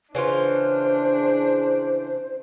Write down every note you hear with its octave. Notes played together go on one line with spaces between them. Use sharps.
C#3 E3 D4 F4 C5